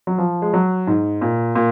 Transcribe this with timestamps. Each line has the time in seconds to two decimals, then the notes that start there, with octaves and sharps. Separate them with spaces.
0.07 F#3
0.18 F3
0.42 G#3
0.54 F#3
0.87 G#2
1.21 A#2
1.55 A#2